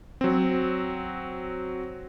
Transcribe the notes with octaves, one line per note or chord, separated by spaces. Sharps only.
F#3 C4